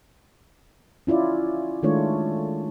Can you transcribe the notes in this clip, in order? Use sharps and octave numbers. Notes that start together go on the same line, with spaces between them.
C#4 E4 F4 D5
D#3 G#3 A3 D4 F4 C#5